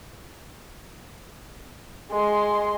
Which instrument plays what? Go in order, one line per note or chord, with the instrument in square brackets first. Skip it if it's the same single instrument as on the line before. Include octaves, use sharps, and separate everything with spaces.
[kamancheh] G#3 C6